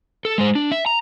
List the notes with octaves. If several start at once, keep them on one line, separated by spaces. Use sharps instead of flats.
A4
G#3 C5
D4
E5
A#5